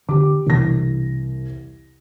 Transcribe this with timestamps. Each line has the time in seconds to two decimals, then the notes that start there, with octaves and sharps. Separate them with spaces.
0.09 D3 G4 D6
0.46 C2 B2 E3 D4 A#6